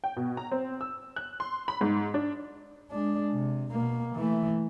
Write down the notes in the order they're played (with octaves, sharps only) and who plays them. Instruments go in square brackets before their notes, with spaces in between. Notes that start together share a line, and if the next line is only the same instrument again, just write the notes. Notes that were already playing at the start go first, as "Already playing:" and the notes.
[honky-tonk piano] G5
B2
A#5
C4
E6
F#6
C6
B5
G#2
D4
[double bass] G#3 D4
C3
B2 A#3
E3 A3